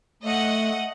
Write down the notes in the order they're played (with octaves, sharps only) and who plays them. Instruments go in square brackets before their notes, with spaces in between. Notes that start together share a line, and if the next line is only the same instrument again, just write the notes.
[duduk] A3 [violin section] D#5 F#5